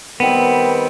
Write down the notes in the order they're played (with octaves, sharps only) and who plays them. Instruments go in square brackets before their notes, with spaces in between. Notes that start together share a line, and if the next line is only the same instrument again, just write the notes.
[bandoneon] D#3 G3 C4 [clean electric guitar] B3